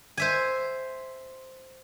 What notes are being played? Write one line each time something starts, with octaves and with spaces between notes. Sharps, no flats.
C5 E5 G#5